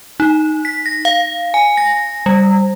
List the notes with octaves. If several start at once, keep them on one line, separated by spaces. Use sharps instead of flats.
D#4
B6
A#6
F5
G#5
A#6
G3